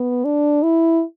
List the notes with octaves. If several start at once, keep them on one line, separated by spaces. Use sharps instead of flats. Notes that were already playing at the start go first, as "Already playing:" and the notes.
Already playing: B3
D4
E4